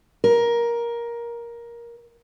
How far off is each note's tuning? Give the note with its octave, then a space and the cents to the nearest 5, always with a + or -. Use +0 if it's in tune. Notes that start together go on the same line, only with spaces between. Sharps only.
A#4 +15